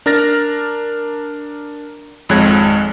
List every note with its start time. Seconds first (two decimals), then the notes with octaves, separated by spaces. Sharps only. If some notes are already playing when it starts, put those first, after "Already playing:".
0.06 D4 A#4 F6 A6 A#6
2.29 G#1 F2 G#3 C#5 F#6 G#6